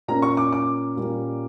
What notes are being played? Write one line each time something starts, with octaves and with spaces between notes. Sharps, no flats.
A#2 A#3 C#4 A#5
C#6
D6
D6
A#2 G3 A#3 C#4